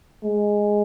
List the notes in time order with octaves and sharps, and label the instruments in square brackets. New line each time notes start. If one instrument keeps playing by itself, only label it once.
[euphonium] G#3